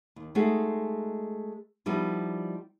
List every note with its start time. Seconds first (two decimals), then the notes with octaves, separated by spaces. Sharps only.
0.16 D#2
0.35 G#3 A3 D#4 F#4 G#4
1.86 F3 G3 B3 D#4 E4